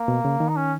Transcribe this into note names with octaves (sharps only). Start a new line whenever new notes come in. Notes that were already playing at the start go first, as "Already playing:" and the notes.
Already playing: A#3
B2
C#3
D#3
D#4
C#4